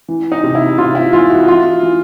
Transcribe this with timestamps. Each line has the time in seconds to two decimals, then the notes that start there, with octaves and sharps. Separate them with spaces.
0.08 E3
0.32 D#4
0.43 C3
0.55 E4
0.78 C3 F4
0.95 E4
1.13 E3 F4
1.30 F#4
1.48 E3 F4
1.83 E3